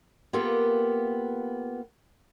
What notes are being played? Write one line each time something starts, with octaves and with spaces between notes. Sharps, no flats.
A#3 B3 F4 G4 A4 A#4